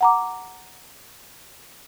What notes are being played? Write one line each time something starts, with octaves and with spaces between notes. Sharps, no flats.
F#5 A#5 D6